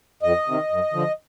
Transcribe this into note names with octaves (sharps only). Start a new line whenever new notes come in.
F2 D#5
C3 D#3
F#2
D3 F3